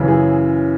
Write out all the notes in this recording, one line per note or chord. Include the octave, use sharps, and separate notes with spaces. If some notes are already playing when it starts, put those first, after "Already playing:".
Already playing: F#2 C#3 E3
G#4